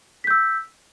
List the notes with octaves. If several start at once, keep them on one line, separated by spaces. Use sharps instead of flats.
E6 G6 B6